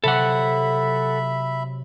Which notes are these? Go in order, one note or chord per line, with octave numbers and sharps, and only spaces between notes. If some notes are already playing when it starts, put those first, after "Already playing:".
C3 F#3 A4 E5 F#5 B5